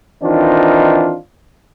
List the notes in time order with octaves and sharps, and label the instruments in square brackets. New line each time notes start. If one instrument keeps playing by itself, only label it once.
[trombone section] D#3 E3 C4 D4 D#4 F4